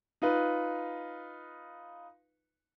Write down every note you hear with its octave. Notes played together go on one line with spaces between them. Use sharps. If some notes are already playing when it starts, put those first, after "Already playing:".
D#4 F4 B4